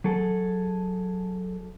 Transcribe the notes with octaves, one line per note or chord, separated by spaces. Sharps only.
F#3 G#4 A4